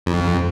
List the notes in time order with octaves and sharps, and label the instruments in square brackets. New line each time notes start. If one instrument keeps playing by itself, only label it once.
[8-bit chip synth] F2